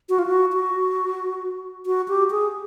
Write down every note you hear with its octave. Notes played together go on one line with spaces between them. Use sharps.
F#4
F4
F#4
F#4
F#4
G4
G#4